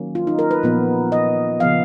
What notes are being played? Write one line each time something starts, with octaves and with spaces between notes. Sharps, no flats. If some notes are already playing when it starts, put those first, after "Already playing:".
Already playing: D#3 F#3 A#3 C#4
F4
D#4
A#4
B4
A#2 F3 B3
D#5
C#3 F3 B3 F5